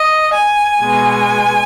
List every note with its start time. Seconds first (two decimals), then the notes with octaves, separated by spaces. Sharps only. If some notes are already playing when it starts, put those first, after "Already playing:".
Already playing: D#5
0.33 G#5
0.80 B2 G#3 B3